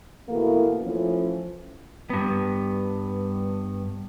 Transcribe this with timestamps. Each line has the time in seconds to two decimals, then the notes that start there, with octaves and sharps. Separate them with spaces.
0.29 B2 E3 A3 A#3
0.82 E3 F3 A3 C#4
2.10 G2 B3